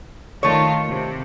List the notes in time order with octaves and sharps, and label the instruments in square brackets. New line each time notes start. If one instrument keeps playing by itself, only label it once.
[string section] D#3 F4 [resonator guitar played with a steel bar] A3 C#5
[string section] C3